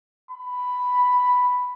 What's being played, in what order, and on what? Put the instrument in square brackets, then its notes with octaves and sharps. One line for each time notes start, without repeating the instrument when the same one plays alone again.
[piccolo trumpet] B5